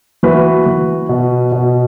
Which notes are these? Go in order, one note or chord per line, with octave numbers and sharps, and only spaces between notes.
E3 F#4 B4
E3
B2
B2